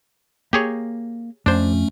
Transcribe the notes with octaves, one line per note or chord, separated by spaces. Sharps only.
A#3 G4 G#4 C#5
F2 A3 C#4 D4 C5